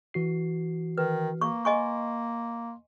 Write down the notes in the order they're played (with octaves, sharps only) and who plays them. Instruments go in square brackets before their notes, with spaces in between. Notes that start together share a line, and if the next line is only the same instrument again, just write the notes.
[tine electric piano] E3 F#4 C7
[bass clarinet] D#3 [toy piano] B4
[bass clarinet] A#3 [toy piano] C#6
[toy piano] D#5 G#5 C#6 [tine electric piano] C6